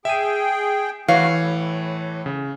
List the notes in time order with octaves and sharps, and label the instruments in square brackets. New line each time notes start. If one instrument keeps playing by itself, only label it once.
[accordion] G#4 G5 [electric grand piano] E5 D#7
[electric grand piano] E3 C#5 [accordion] A3 F#4 [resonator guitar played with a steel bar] F5
[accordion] A2
[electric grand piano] C#3